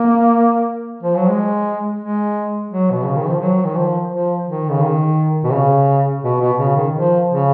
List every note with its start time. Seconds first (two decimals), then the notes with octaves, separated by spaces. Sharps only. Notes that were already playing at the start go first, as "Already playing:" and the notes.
Already playing: A#3
1.03 F3
1.16 F#3
1.28 G#3
1.99 G#3
2.70 F#3
2.91 B2
3.04 C#3
3.16 D#3
3.29 F3
3.41 F#3
3.64 D#3
3.76 F3
4.11 F3
4.47 D#3
4.70 C#3
4.82 D#3
5.44 B2
5.53 C#3
6.24 B2
6.41 B2
6.59 C#3
6.76 D#3
6.94 F3
7.30 C#3